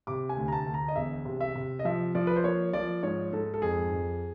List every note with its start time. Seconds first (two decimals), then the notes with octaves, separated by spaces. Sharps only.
0.07 C3 D6
0.29 G#5
0.37 D2
0.48 A#5
0.52 A5
0.66 D2
0.74 A#5
0.88 D#5
0.96 E1 E5
1.25 C3
1.41 E5
1.55 C3
1.79 D#5
1.85 F3 E5
2.15 F3 D5
2.27 B4
2.36 C5
2.44 A#3 C#5
2.73 F3 D5
3.03 G#2 C#5
3.33 G#2 A4
3.54 A4
3.62 F2 G#4
3.92 F2